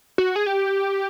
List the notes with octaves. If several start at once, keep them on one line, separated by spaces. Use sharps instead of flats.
F#4
G#4
G4